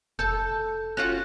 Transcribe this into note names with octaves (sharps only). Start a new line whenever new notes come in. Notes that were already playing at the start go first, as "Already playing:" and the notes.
F1 A4 G6
C#4 F4 F#4 F#6